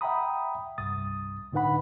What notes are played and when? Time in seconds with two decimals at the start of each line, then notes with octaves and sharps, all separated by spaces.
0.01 E5 F#5 G5 A#5 B5 D#6
0.78 C2 G2 D#6 A6
1.52 A2 D3 D#4 B4 F#5 B5